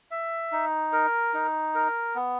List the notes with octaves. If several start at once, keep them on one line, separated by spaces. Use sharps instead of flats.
E5
D#4
A#4
D#4
A#4
B3